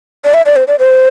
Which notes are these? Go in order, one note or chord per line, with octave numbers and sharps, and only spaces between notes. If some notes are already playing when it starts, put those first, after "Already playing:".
D5
E5
D5
C5
D5
C5